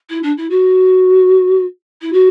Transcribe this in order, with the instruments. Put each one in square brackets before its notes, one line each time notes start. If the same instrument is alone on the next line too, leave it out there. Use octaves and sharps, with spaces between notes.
[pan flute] E4
D4
E4
F#4
E4
F#4